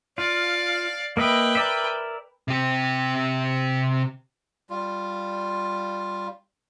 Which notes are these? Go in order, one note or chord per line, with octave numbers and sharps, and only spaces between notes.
F4 D5 F5
A#3 B4 D#5 E5 G5
A#4 D5 E5
C3 G4
G3 F4